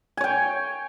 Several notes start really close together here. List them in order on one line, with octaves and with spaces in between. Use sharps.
G#5 C#5 G5